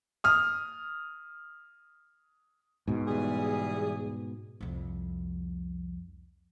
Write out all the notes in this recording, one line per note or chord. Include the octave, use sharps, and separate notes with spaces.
D#6 F6
G#2 B2
E2 G3 G#4
C2 F2